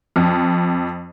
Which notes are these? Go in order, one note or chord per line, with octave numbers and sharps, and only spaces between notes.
F2